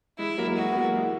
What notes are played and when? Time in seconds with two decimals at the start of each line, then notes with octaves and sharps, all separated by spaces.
0.19 E3 G#3 E4
0.38 F#3 A#3
0.48 A#3
0.57 E3 G#3 F#4
0.72 B3
0.77 F#3 A#3
0.95 E3 G#3